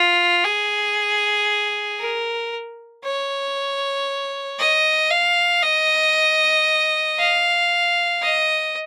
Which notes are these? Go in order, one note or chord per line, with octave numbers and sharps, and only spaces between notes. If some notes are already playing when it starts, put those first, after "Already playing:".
Already playing: F4
G#4
A#4
C#5
D#5
F5
D#5
F5
D#5